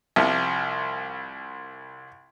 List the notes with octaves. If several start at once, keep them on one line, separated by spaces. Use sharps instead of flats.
C2 C3 F3